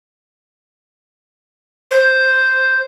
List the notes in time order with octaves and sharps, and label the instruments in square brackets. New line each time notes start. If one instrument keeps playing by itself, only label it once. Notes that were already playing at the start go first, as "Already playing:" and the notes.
[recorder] C5